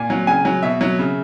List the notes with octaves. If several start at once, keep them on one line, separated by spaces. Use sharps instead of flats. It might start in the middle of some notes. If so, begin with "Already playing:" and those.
Already playing: A#2 G#5
F#3
C#3 G#5
F#3
B2 E5
F#3
C#3